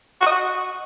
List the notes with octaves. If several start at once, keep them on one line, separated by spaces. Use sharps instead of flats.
F#4
D#5
F#4